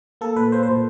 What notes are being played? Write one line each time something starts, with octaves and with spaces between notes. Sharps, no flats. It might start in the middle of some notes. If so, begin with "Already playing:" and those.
A#3 A4
A#2 B4
A#3 C5
C5
A#2